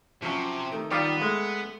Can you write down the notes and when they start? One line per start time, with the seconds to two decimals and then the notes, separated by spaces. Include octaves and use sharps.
0.22 C3 F3 F#3 C#4
0.72 D#3 A3
0.91 D#3 G3 B3 F4 D5
1.22 G#3 A3